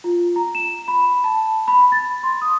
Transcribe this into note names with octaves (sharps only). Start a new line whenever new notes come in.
F4
A#5
E7
B5
A5
B5
A6
C6
D#6